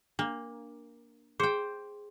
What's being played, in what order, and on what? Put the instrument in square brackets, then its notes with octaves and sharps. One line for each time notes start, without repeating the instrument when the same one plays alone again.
[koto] A#3 [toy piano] D4
[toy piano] G#4 [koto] C5 G5